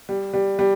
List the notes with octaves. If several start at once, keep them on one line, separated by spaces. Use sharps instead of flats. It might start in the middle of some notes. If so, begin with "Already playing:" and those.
G3
G3
G3